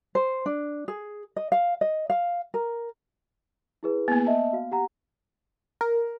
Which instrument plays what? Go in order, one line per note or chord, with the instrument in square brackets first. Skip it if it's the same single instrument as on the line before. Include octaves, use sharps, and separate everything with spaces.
[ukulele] C5
D4
G#4
D#5
F5
D#5
F5
A#4
[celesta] E4 G#4 B4
[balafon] A#3 B3
[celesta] D#5 E5 A5
F#4 F5
G4 F#5 A#5
[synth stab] A#4